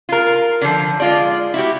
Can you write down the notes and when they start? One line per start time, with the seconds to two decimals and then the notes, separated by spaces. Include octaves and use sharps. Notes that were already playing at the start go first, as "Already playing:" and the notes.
0.09 F4 A#4
0.62 D3 F3
1.00 G#3 F4 D5
1.54 E4 F#4 G4